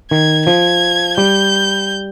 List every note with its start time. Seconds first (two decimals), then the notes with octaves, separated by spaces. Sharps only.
0.11 D#3 G#6
0.46 F3 G#6
1.17 G3 G6